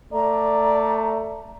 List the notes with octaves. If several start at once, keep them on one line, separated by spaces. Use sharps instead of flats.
A3 D5 A#5